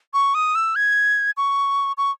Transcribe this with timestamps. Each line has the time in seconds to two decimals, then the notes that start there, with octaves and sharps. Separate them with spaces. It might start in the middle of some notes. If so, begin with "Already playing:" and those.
0.14 C#6
0.35 D#6
0.55 E6
0.76 G#6
1.37 C#6
1.98 C#6